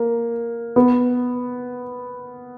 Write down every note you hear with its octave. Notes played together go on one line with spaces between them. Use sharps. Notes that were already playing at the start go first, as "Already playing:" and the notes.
Already playing: A#3
B3